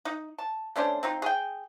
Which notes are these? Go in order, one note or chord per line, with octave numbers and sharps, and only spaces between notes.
D#4
A5
A3 C#4 D4 C5
C4 D#4 F4
G#4 G5